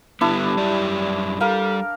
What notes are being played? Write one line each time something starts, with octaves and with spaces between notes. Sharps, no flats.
D3 G3 B3 D4 E4
F#2 G4 D5
G3 A4 A#4 F5